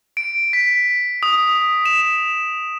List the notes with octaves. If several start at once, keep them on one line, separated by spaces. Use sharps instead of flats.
D7
B6
D#6
E7